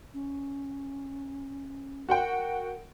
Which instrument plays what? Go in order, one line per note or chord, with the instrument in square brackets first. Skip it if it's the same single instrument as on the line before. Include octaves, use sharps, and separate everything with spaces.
[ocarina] C#4
[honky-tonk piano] F#4 F#5 G5 [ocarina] A#4